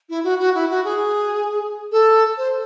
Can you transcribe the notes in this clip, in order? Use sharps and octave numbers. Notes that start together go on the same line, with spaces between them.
E4
F#4
F#4
E4
F#4
G#4
A4
C5